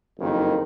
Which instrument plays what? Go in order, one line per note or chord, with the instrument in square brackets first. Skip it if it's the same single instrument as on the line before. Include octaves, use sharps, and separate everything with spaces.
[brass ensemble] F#1 F2 D#3